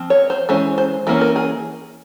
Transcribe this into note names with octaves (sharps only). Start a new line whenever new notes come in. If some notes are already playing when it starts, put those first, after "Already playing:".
Already playing: F3 C4
C#5
C5
E3 G#3 C#4 C5
C5
E3 A#3 C#4 A#4
A#4
G#4